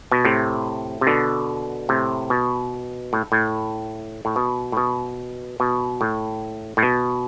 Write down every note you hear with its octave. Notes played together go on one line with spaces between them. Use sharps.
B2
A2 C3
C3
B2 D3
A2 C3
B2
A2
A2
A2
B2
A2
B2
B2
A2
A2
B2